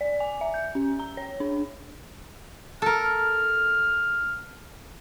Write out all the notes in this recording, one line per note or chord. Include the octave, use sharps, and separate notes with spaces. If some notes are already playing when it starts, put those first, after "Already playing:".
D5
G#5
E5
G6
C#4
A#5
C#5
D4
A4 A#4 F6